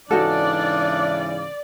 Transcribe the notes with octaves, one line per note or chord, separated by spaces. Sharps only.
G#2 C#3 E3 D4 D#4 F#4 A4 D5